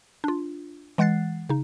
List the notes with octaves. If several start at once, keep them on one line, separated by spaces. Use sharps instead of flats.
D4 F4
E3 G#3 F#5 F#6 A6 C7
C#3 D#4